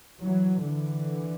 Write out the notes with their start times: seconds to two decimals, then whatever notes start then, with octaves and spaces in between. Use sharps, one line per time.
0.20 E3 F#3
0.62 D3 E3